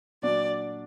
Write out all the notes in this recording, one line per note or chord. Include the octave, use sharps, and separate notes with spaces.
A#2 F#3 D4 F#4 D5